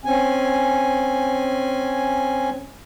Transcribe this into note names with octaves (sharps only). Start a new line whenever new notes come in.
C4 C#4 G#5